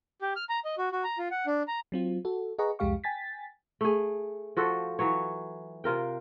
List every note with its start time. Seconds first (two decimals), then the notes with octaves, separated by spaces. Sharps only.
0.22 G4
0.36 F6
0.49 A#5
0.65 D#5
0.78 F#4
0.92 F#4
1.04 A#5
1.18 F4
1.31 F#5
1.47 D4
1.68 A#5
1.92 F#3 C4 F4
2.25 F#4 A4
2.59 G#4 B4 D#5 F#5 A#5 C#6
2.79 C2 F2 G#3 G4 F5 C#6
3.04 G5 G#5 A6 B6
3.81 A3 G#4
4.57 F3 F#4 A4 C5
4.99 E3 F#3 C#5
5.84 C3 F4 A#4 G5